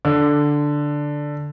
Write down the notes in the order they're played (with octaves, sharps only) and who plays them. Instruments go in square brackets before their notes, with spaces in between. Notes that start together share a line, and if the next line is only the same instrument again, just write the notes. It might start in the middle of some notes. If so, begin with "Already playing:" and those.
[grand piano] D3